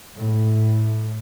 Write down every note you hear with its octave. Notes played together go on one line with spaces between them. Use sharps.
A2